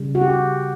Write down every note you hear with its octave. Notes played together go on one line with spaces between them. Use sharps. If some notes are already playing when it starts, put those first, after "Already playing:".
Already playing: C#3 G3
F#4
G4
F#4